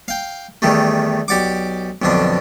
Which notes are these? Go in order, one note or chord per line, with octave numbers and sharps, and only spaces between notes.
F5 G5
E2 D#3 G3 A3
B1 G4 D5 F#5 D6
B1 F2 B2 D3 D4